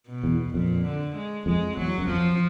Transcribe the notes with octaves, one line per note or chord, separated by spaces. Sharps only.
B2
E2
F2 A#2
D3
G#3
F2 G#3
E2 F#3
F#2
F2 F3